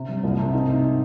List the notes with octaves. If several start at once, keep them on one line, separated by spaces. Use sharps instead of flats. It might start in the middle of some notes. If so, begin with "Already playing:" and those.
Already playing: C3
G3
C2
C3
D#4
G#2